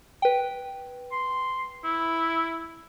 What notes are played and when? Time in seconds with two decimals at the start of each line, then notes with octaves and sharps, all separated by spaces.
0.22 B4 G5
1.12 C6
1.84 E4